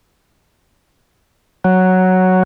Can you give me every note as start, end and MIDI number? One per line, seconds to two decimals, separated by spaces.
1.64 2.43 54